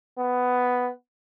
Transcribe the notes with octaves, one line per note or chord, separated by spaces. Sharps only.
B3